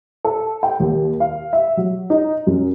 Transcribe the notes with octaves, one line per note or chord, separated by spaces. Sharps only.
A4
G5
D#2
F5
E5
F#3
D#4
F#2